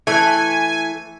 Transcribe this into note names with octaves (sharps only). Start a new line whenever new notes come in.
E3 A3 G#5